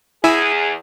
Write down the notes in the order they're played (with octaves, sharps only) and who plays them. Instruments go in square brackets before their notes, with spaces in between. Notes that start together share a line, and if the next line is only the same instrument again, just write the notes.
[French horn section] E2 G#4 [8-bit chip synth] E4 G#5 E6